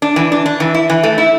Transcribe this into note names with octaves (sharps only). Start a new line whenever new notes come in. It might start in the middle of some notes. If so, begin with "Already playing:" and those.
D4
E3
D4
D4
E3
E4
E3
A3
E4